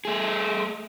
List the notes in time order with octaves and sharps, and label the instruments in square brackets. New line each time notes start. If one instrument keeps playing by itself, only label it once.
[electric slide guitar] A3 G#4